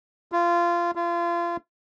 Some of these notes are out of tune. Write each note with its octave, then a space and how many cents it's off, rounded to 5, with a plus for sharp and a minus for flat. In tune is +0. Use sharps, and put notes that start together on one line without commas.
F4 -20
F4 -30